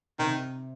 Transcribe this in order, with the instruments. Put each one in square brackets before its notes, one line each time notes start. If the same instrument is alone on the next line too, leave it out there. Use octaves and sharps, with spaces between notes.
[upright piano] C3 [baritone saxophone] D#3